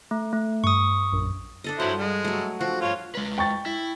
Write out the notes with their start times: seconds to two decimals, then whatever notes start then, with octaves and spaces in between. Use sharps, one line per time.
0.11 A3
0.33 A3
0.64 G2 C#6 D#6
1.12 A#1 F#2
1.64 D4 A4 D#5
1.80 G2 F3 F#3 E4 C5 F#5
1.99 G#3
2.24 F#3 A3
2.61 F3 C4 D4 F#4
2.82 G2 E3 F4 A#4 C#5
3.15 G#3 B4
3.38 G5 C#6 A6
3.66 E4